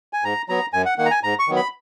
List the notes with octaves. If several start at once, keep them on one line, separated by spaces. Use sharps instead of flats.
G#5
G#2 A#5
F#3 B3 A#5
F#2 G#5
F#5
D#3 A#3 F#5
A#5
G#5
G#2 A#5
C#6
D#3 F#3 B3
B5